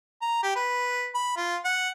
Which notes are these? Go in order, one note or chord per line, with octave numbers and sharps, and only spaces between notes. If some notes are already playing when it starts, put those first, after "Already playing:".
A#5
G4
B4
B5
F4
F#5